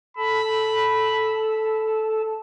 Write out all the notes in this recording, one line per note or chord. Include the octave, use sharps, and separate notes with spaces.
A4 A5 B5